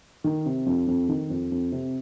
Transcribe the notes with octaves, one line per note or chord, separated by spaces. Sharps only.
D#3
C3
F2
F2
D#3
F2
F2
C3